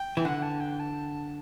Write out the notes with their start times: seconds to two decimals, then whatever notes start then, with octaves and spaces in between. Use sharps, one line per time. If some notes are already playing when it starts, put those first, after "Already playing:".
Already playing: G5
0.17 E3
0.25 D3 F#5
0.43 A5
0.60 G5
0.79 A5